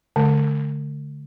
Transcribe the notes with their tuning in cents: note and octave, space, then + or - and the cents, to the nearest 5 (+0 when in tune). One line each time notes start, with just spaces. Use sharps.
D3 -25 A3 -45